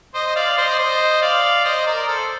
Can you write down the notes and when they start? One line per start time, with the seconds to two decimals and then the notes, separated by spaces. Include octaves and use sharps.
0.14 C5 D#5
0.27 D#5
0.36 D5 F5
0.57 C5 D#5
0.70 D5
0.79 C5 D#5
1.22 D5 F5
1.65 C5 D#5
1.86 A#4 D5
2.08 A4 C5